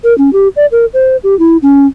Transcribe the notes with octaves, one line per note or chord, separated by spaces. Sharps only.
A#4
C#4
G4
D5
A#4
C5
G4
E4
C#4